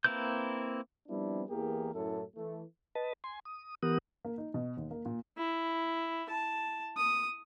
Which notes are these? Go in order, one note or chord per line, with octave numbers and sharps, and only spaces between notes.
A#3 C4 E4 B4 G6
F3 G3 B3 C4 D4 E4
E2 E3 A#3 G4 G#4 A#4
F#2 A2 C#4 E4 A4
E3 A3
B4 D#5 A5
G#5 C6
D#6
E3 B3 G4 A#4 F#5 D#6
A#3
D#4
B2
D#2
A#3
A#2
E4
A5
D#6